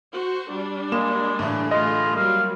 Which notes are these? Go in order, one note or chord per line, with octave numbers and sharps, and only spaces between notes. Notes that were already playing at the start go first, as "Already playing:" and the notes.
F#4 C5
G3 D4
G#3 A#3 E7
A2 D3 E3
A3 F4 G#4 D#5
F#3 G3 A#3 F5